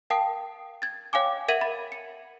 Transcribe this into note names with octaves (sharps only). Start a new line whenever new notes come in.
A#4 F5 G5 A5 D#6 C7
G#6 A6
C#5 F5 G5 G#5 D6
A#4 E5 F#5 G#6 D#7 F#7
B5 A6
C#7